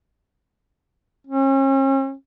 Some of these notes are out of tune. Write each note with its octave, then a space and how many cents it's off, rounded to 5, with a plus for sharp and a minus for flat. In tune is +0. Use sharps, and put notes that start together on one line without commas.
C#4 -40